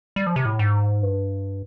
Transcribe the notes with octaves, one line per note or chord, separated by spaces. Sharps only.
G3
F3
C3
A2
G#2
G2